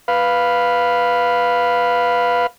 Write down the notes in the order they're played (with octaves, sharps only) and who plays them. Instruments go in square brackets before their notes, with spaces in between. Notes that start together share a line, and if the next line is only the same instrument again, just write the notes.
[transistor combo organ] B4 F5